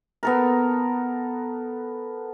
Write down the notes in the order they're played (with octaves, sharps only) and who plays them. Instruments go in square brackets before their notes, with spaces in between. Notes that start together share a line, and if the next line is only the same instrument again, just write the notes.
[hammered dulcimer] B3 A4 A#4